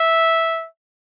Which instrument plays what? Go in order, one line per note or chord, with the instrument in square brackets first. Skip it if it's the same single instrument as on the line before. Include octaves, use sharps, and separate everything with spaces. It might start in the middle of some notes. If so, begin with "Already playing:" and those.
Already playing: [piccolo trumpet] E5